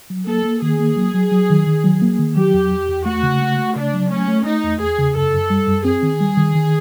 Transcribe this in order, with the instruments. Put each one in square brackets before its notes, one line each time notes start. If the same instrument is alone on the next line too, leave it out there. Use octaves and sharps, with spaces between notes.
[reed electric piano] F#3
[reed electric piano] A#3 [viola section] A4
[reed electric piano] A#3
[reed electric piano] D#3 [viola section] G#4
[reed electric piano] A#3
F#3
F#3
F#3
D#3
D#3
F#3
A#3
D#3
[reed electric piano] F#3 [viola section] G4
[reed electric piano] E2
E2
E2
[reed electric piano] A3 [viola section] F#4
[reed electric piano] C#3
A3
A3
[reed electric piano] C#3 [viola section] D4
[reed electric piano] F#3
[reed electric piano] A3 [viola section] C#4
[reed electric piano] A3
[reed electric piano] A3 [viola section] D#4
[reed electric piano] E2
[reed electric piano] E2 [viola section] G#4
[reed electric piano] C#3
[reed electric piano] F#2 [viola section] A4
[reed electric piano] F#2
G3
F#2
[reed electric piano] C4 [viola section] G#4
[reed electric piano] D#3
G3
D#3
D#3